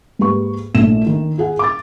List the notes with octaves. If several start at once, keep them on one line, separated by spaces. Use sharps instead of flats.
G#2 A#3 G4 B4 C#6
A#1 A2 A4 E7
D#3
F4 G#4 F#5
D6 A6